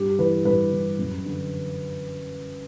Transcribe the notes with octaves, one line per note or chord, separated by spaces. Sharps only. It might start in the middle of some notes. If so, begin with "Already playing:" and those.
Already playing: G2 G4
E3 B4
G2 B4
E3
F#2
D3